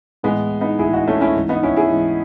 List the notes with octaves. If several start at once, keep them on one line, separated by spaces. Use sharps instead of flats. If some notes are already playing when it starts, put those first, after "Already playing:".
A2 E3 G#3 B3
B3 D#4
A2 E3 E4 G#4
D#4 F#4
A3 C#4
C#4 E4
G#2 E3
B3 D#4
C#4 E4
E4 G#4
G#2 E3